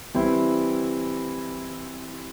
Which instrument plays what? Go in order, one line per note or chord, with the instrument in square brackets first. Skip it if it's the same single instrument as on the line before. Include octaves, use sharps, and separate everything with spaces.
[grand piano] E3 G3 C4 E4